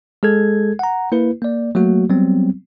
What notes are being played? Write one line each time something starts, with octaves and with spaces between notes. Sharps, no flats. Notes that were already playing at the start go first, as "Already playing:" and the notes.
G#3 G#4 A4 G#6
F#5 A#5
A#3 E4 B4
A#3 D5
F#3 A3 A#3 F#4
F#3 G3 B3 C4